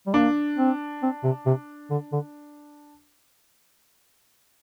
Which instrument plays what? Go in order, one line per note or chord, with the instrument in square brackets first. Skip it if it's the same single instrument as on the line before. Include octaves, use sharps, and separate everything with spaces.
[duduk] G3
[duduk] A#3 [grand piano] D4
[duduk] C4
C4
C3
C3
D3
D3